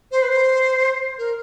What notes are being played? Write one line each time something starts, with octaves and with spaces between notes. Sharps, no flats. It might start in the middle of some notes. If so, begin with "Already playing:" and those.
C5
B4
C5
A#4